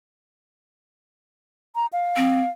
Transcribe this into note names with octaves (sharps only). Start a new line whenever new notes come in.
A#5
F5
C4